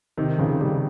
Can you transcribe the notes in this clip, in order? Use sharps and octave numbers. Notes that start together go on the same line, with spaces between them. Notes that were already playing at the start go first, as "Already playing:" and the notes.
C3 D#3
C#3 F3
D#3 G3